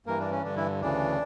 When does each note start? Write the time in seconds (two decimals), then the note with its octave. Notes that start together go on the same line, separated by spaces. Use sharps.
0.06 G2 E3 A#3 A#4
0.20 D4
0.31 C#4
0.43 G2 D3 D4
0.56 E3 E4
0.81 D2 C#3 E3 D4